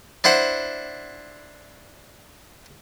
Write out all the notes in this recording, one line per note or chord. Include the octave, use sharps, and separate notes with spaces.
D4 E4 C5 F#5